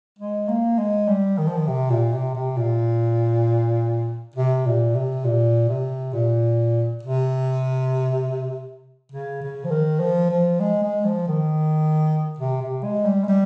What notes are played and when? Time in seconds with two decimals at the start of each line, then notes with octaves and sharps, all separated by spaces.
0.19 G#3
0.48 A#3
0.78 G#3
1.08 G3
1.38 D#3
1.48 F3
1.57 D#3
1.67 C3
1.90 A#2
2.13 C3
2.35 C3
2.57 A#2
4.36 C3
4.66 A#2
4.95 C3
5.24 A#2
5.69 C3
6.13 A#2
7.03 C3
9.12 C#3
9.42 C#3
9.64 F3
9.71 D#3
10.00 F3
10.30 F3
10.60 G#3
10.83 G#3
11.05 F3
11.28 D#3
12.39 C3
12.62 C3
12.84 G#3
13.05 G3
13.24 G#3
13.28 G3